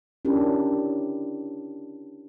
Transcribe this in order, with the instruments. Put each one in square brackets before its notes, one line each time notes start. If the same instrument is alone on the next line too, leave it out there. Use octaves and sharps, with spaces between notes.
[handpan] C#4 D4 E4 G4 A#4